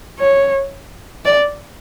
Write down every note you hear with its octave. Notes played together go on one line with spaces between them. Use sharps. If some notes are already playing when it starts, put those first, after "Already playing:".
C#5
D5